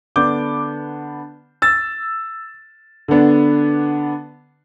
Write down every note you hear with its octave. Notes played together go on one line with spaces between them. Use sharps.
D3 B3 D4 D6 G6
E6 A6
D3 B3 D4